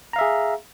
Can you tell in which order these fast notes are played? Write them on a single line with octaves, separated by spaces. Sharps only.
A#5 F5 E5 G#4